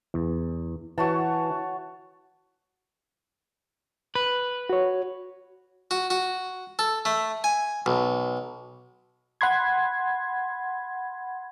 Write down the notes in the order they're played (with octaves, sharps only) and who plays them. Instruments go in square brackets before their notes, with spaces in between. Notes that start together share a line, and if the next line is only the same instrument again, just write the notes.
[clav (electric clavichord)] E2
[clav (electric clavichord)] E3 [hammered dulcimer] F#4 C#5 A5
[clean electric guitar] B4
[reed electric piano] F#4 C#5
[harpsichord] F#4
F#4
A4
A3
G#5
B1
[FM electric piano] F#5 B5 C6 G#6